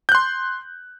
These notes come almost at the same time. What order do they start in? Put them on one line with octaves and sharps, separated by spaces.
G6 F#6 C6